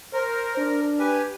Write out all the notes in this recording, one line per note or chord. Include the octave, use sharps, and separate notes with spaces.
A#4 C5
D4
G4 B4 G#5